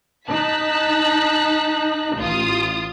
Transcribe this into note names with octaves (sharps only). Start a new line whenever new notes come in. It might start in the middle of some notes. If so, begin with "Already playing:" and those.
D#4 A5 F#6 B6
A1 F4 D#6